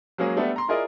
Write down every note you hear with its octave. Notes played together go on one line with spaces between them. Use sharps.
F#3 G#3 A#3 C#4 G#4
G3 A3 B3 D4 A4
A#5 C6
E4 F4 G#4 A#4 D5 D#5